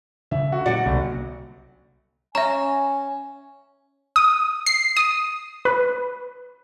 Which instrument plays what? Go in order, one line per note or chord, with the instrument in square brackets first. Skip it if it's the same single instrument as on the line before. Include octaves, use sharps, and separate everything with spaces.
[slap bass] C#3 [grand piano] E5
[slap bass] D2 [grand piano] F#4
[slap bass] A#2 F#3 G3 [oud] F#4 [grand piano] D5
[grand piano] G1 [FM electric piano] C2
[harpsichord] C#4 [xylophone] E5 A#5 [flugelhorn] G#5
[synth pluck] D#6
C7
D#6
B4